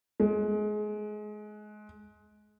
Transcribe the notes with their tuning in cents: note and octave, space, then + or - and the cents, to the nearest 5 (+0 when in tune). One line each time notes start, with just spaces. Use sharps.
G#3 +25